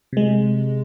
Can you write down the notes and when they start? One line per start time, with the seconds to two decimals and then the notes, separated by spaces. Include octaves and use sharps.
0.13 C3 G#3